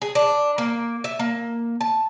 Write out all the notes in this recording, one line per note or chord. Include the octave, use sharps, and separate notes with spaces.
G#4
D4
A#3
E5
A#3
A5